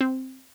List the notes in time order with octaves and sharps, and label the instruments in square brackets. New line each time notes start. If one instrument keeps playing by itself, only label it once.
[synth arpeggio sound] C4